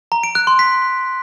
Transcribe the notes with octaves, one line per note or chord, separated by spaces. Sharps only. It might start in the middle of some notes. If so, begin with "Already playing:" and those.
A#5
D7
F#6
C6
B6